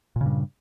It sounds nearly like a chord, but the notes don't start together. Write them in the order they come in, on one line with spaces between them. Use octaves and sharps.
A#2 C#3 G2